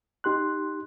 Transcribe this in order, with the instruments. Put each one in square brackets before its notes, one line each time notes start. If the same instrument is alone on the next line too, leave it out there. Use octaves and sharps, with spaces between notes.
[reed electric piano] D#4 G4 C6 F#6